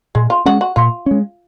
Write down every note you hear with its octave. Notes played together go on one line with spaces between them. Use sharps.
A#2 G#3
F4
G#3 C#4 F#4
F#4
A#2 F4
G#3 C#4